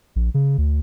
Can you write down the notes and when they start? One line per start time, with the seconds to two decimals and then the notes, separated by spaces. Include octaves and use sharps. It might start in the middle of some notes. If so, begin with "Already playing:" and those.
0.16 A#1
0.34 C#3
0.58 D2